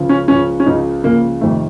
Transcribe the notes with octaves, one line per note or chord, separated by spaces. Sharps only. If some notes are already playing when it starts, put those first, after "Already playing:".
Already playing: C#2 C#3 F3
C#4
C#2 C#3 F3 C#4
C#4
C#2 C#3 F3 D#4
C#2 C#3 F3 A#3
F2 C3 D#3 A3